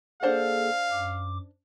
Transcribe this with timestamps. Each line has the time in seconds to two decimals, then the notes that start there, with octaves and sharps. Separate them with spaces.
0.23 A#3 D4 G#4 A4 C5 F5 F#5
0.91 F#2 D6